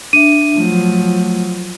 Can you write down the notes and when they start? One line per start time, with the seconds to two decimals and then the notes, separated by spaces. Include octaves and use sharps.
0.13 D4 E5 D#7
0.57 F3 F#3 A3